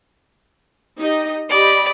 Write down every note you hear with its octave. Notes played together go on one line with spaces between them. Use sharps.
D#4 G4 D#5
G4 D5 D#5 B5